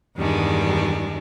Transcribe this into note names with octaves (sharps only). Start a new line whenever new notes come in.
E2 G2 D#3 G3 G#3 D4